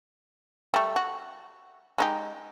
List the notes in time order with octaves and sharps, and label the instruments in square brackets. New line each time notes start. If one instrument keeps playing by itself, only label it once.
[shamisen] G3 A3
F#4
G#3 D#4 G4